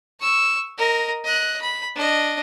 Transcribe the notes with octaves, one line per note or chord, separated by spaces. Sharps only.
C#6 E6
A#4 D#5
D#5 F#6
B5
D4 D#5